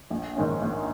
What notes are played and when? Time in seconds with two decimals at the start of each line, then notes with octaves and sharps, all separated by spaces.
0.10 A#1
0.36 G#2 D#3 G#3 C#4
0.62 A#1